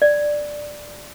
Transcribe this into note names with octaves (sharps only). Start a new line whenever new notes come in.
D5